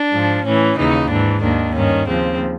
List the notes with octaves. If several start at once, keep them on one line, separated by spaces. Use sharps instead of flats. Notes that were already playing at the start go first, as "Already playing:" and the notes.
Already playing: D4
G#2 F3
A2 E3 C#4
D#2 C#3 E3 D#4
G#2 E3 D4
D#2 D#3 D4
G2 D#3 C#4
D#2 C#3 F3 C4